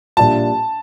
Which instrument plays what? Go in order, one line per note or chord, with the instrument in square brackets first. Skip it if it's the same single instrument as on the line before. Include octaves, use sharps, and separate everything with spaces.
[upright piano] A#1 A#2 G3 D4 F4 [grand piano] A5